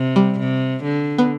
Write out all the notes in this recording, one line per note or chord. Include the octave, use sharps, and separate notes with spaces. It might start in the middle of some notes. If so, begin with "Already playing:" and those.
Already playing: C3
G3
C3
D3
B3